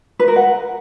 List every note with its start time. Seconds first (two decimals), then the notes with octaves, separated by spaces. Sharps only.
0.19 B4
0.28 A#4
0.36 F#5